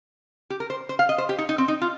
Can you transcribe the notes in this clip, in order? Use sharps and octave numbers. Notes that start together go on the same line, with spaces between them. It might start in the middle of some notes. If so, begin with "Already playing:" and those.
G4
A#4
C5
C5
F5
D#5
C5
G4
D#4
D#4
C4
D#4
F4